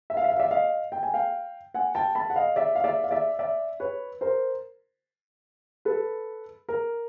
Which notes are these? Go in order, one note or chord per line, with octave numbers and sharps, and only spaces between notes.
E5
F5
E5
F5
D5 E5
D#5 F5
G5
G#5
F5 G5
F#5 G#5
G5 A5
A5 B5
F#5
D#5 F5
D5 E5
F5
D5 E5
F5
D5 E5
D5 E5
B4 C#5
A#4 C5
A4 B4
A#4